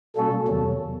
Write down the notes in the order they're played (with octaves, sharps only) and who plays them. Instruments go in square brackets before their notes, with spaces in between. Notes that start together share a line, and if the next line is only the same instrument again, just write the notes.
[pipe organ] B2 G3 A#3 C#4 F#4 [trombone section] A4
[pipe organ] E2 C3 D#3 F#3